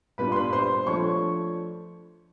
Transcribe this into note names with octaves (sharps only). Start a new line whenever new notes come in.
A#2 G3 B3 D4 B4 B5
C6
B4 B5
C5 C6
F3 A3 D4 C#5 C#6